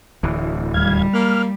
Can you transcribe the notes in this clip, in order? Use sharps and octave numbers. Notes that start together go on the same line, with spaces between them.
D1 D2 E3
D#2 G3 F5 G#6
A#3 F6